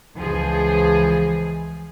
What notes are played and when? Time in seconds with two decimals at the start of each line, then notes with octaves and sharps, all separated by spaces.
0.17 C#2 E3 F3 G#4